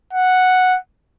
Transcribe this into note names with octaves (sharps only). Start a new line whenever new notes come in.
F#5